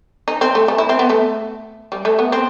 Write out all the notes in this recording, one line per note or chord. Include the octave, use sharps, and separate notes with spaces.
D#4
C4
A3
A3
E4
C4
B3
A3
G3
A3
B3
C4